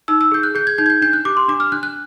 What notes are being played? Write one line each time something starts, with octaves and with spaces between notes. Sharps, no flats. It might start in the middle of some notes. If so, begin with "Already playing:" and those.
D#4 E6
E6
G#4 G6
F#6
G#4 G6
G#6
D#4 G6
G#6
G6
D4 G6
F#6
G4 D6
C6
D4 D6
F6
D4 F#6
F#6